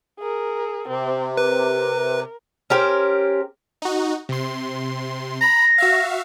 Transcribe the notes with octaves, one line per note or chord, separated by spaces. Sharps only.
G#4 A#4
C3 C4
A#4 B4
C#4 G4 A#4 C5
D#4 F#4
C3 C6
A#5 B5 A#6
F#4 E5 F5